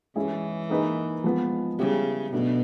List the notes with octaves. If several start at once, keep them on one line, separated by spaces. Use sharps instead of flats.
E3 G#3 C#4 E4 G#4
A#3 D#4 G#4 B4
F3 G#3 B3
C#3 G3 B3 E4 G4
B2 F#3 A3 D4 F#4